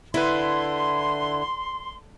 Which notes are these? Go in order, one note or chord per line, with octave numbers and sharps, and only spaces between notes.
D3 E4 B4 C6